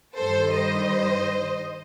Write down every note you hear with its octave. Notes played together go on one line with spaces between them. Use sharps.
G2 D#3 G3 A4 C5
C5 D#5